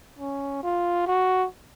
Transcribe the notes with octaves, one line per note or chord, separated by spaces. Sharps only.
C#4
F4
F#4